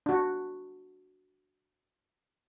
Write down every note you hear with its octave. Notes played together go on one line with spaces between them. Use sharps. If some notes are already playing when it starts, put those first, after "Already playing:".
D4 F#4